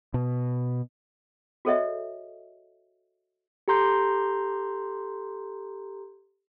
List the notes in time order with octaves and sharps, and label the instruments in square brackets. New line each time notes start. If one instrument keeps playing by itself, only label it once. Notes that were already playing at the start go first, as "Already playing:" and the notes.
[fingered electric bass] B2
[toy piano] F#4 G#4 A4 C#5 D#5 E5
[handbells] G4 A4 A#5 C6 G6